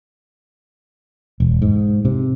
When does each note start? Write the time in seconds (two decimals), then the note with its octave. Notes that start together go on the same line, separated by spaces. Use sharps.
1.40 E1
1.62 G#2
2.05 C3